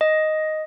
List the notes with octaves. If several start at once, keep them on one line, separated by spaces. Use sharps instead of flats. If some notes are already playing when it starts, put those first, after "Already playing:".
D#5